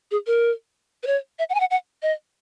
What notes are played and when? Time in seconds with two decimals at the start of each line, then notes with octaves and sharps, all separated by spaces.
0.11 G#4
0.27 A#4
1.03 B4
1.07 C#5
1.39 E5
1.50 F#5
1.54 G#5
1.60 F#5
1.71 F#5
2.02 D#5